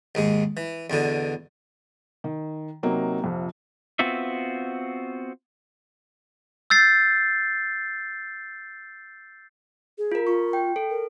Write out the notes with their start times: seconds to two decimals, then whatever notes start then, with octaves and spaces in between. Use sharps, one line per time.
0.15 D#2 G#2 G#3
0.57 E3
0.90 E2 B2 D3
2.24 D#3
2.83 C3 F#3 A#3 C4 D#4
3.22 A#1 F2 C3
3.99 B3 C4 F4 F#4 E5
6.70 E6 G6 A6 C7
9.98 G#4
10.12 F4 A#4
10.27 F4 C#6
10.53 G5
10.76 A4
10.90 A#4